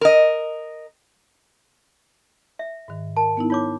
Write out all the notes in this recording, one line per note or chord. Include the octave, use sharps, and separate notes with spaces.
A#4 D#5
E5
G#2 D#3
A#4 A5
B3 D#4 E4
F4 C#5 A5 D6